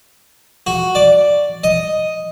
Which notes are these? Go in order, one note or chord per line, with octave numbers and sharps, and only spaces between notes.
F#4
D5
D#5